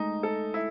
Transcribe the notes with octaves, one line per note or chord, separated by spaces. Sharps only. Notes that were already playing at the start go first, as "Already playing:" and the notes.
Already playing: G#3 A3 D#4
A4
E4